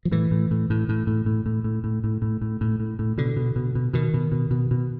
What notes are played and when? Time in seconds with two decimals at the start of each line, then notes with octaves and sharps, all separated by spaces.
0.05 F3
0.12 A2 E3
0.31 A2
0.51 A2
0.70 A2
0.89 A2
1.07 A2
1.26 A2
1.46 A2
1.64 A2
1.84 A2
2.04 A2
2.22 A2
2.42 A2
2.61 A2
2.80 A2
2.99 A2
3.18 B2 D3
3.37 B2
3.56 B2
3.75 B2
3.93 B2 D#3
4.14 B2
4.32 B2
4.51 B2
4.71 B2